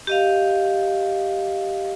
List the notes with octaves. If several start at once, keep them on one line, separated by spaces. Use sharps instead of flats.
G4 D#5 F5